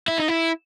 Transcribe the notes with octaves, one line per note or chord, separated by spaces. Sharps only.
E4
D#4
E4